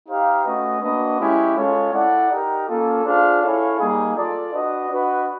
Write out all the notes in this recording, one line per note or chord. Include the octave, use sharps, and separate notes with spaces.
D#4 G4 C5 F5
A3 C#4 F#4 B4 D#5
A#3 D4 F#4 B4 D#5
G#3 C#4 E4 G4
G#3 C#4 F4 A4 C#5
E4 A4 D5 F#5
D#4 G4 A#4
A#3 C#4 F4 A4
D4 F4 G#4 C5 F5
C#4 E4 A4 C#5 F5
G3 A#3 D#4 G#4
F4 A4 D5
D4 F#4 B4 D#5
D4 F#4 B4 D#5